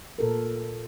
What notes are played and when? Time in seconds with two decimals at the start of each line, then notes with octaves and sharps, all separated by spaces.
0.19 A#2 A4 A#4